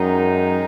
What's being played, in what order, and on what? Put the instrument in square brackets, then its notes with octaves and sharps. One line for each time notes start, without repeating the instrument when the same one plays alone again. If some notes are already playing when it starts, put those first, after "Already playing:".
Already playing: [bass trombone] F#2 [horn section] D#3 G#3 D#4